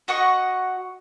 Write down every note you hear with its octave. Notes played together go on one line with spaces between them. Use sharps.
F#4 D#5 F#5 C#6